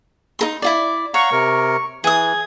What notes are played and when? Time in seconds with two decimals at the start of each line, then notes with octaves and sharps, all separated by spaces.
0.39 D#4 A#4 C6
0.62 E4 F4 D5
1.14 C#5 F5 F#5 A#5 C#6
1.32 C3 A#4
2.04 E3 G#4 D#6 G#6